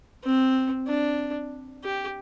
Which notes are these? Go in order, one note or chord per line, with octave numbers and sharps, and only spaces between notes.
C4
D4
G4